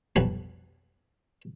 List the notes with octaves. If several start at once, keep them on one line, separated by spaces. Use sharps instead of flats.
B1 F2 F3 G3 F#4 G#5